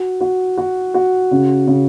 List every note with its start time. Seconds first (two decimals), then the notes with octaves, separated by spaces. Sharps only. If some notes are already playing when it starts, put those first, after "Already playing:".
Already playing: F#4
0.21 F#4
0.57 F#4
0.94 F#4
1.31 C#3
1.67 C#3